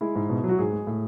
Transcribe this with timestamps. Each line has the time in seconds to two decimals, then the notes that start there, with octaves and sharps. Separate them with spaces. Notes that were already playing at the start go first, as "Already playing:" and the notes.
0.01 G#3 E4
0.16 G#2
0.30 B2
0.44 F#3
0.49 F#4
0.59 G#2 G#4
0.73 G#3
0.87 A2